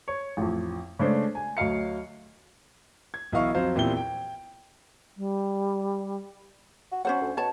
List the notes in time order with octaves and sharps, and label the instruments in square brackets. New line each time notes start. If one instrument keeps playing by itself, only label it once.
[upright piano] C#5
A1 F2
C#3 G#3 A3 D4 C5
G#5
D2 F#3 D#5 F5 C#7
[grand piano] G#6
B1 E3 E4 D#5 F5 C#6
F2 F#3 C5 F5
E2 A#2 C4 E4 G4 G7
G5
[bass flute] G3
[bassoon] F#4
[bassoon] F#3 [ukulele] C#4 C5 F#5
[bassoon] D2
[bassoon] B2 [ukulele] C#5 A5